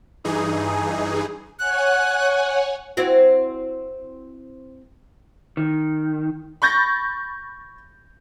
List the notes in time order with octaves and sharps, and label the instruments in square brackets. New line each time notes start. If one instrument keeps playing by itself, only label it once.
[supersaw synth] G2 E3 D#4 G#4
[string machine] C#5 F#5 G#5 [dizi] F#6
[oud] C4 E4 F#4
[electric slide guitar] D#3
[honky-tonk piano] B5 C#6 G6 A6 A#6